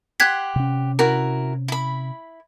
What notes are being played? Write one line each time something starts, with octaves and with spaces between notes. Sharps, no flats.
G4 F#5 C6 F#6 G#6 B6
C3 C#4
E4 F#4 A#4
E4 B5